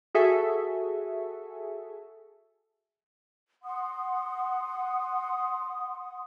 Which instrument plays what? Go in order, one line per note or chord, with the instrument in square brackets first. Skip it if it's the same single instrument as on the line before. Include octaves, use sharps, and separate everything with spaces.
[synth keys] F#4 G#4 A4 E5 G#5
[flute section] F#5 C6 D#6